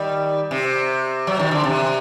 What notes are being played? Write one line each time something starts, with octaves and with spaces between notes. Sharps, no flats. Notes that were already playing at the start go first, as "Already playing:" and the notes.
Already playing: D#3 G3
C3
F#3
D#3
D3
C3